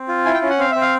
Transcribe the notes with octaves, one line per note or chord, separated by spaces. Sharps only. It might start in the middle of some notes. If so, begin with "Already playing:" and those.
Already playing: C4
F4
E4 G#5
G5
C#4
F#5
C4 F5
C4 E5
F5